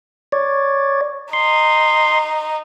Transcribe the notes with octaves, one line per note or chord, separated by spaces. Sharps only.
C#5 D5
D#4 C6